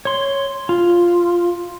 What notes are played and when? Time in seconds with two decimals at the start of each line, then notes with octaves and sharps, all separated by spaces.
0.05 C#5 C6
0.69 F4